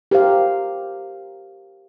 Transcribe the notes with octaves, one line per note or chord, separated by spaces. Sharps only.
G4 A#4 C5 F5